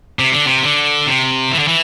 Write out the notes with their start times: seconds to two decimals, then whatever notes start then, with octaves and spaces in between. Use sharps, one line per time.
0.19 C3
0.32 D3
0.46 C3
0.63 D3
1.07 C3
1.51 E3
1.59 D3
1.68 E3